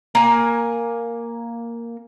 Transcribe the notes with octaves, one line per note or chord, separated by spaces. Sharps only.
A#3 G#5